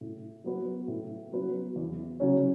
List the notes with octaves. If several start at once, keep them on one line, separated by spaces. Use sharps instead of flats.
A2
F#3 B3 F#4 B4
A2
F#3 B3 F#4 B4
E2
C#3 F#3 C#4